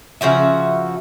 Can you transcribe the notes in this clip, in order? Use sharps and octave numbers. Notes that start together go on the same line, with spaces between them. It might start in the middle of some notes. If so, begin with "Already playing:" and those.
C#3 F3 F#4 E5